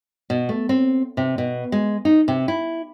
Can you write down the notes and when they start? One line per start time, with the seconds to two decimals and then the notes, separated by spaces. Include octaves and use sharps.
0.30 B2
0.49 A3
0.69 C4
1.17 C3
1.38 B2
1.72 G#3
2.05 D#4
2.28 C3
2.48 E4